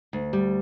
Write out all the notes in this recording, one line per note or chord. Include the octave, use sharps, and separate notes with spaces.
D2
G3